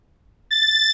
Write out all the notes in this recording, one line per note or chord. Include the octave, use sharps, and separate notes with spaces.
A6